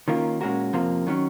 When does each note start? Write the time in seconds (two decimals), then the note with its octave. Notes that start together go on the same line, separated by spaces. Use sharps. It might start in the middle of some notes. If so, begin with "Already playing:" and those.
0.08 D#3 A#3 C#4 F4 A#4
0.41 A#2 G#3 C#4 F#4 A#4
0.73 F2 C3 F3 A#3
1.07 D#3 F#3 C#4